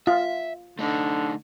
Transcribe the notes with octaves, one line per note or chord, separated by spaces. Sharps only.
F4 E5
D3 A3 D#4